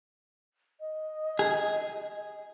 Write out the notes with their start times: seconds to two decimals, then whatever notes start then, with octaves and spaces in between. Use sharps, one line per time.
0.80 D#5
1.39 G#4